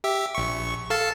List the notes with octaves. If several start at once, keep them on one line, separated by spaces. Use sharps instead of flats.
G4 E5
A#1 C#6
A4 F5 A5